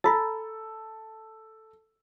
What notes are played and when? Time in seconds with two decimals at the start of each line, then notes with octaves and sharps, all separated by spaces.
0.04 A4 A#5 B5 A6